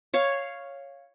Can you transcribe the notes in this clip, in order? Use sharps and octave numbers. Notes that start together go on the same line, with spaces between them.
C#5 F5